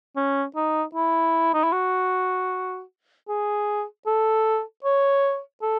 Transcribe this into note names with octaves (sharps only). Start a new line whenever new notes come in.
C#4
D#4
E4
D#4
E4
F#4
G#4
A4
C#5
A4